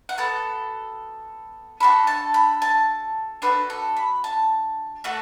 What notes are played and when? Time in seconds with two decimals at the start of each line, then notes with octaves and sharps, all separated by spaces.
0.09 F#5
0.18 B3 F#4 A4 A5
1.80 D4 F#4 A4 B5
2.07 A5
2.34 B5
2.62 A5
3.42 D4 F#4 A4 B4
3.70 A4
3.96 B5
4.24 A5
5.04 A3 F#4 A4